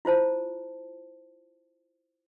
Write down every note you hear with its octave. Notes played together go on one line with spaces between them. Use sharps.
E4 F4 C5 A5